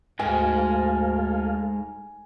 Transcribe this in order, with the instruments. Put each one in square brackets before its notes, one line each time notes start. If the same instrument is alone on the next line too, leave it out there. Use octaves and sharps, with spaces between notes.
[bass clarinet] D2 [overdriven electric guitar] G#2 [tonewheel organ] G#4 A4 F5 [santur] G#5